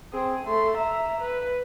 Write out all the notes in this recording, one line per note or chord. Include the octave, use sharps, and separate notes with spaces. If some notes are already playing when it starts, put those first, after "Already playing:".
C4 G#4
A3 C6
E5 A#5
B4